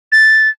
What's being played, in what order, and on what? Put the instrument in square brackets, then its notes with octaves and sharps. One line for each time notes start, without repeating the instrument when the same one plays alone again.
[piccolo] A6